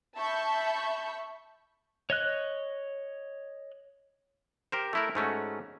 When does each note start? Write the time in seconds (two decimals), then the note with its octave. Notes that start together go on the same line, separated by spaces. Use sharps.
0.17 E5 A5 B5 C#6 G6
2.10 C#5 D#5 F#6
4.72 G4 A#4 C5
4.93 A3 E4 A#4
5.15 G#2 A3 C#4 F#4